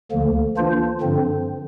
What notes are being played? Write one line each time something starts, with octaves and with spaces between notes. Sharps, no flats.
D2 D3 F3 A#3
E3 A#3 D4 F4 C5
G2 D3 F3 C4